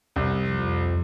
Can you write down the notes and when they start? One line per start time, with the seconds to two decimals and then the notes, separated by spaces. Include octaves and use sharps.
0.16 C2
0.47 F2